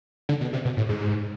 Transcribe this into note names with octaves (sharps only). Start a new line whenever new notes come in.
D3
B2
C3
B2
A2
G#2